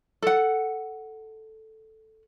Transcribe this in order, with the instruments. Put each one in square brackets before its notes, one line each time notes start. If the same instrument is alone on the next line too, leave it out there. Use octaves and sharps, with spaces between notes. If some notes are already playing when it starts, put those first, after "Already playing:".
[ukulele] A4 F#5